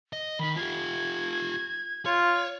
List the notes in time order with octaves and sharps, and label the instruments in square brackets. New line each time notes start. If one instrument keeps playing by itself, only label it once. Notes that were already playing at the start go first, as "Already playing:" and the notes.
[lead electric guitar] D#5
[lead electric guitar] D#3 D#4 [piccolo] B5
[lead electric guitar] F4 G4 [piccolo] G#6
[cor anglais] F4 [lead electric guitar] C#5